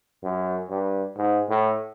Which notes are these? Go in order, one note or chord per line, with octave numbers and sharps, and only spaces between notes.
F#2
G2
G#2
A2